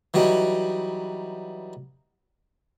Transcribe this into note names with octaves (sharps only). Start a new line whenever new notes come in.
E3 F#3 G3 D#4